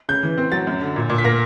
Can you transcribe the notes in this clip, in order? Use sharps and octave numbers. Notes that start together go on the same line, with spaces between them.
C#3 G6
E3
C4
F#3 A6
F#2
D3
A#2
A#2
B6
A#3 A#6